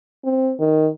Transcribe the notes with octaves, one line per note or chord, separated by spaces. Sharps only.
C4
D#3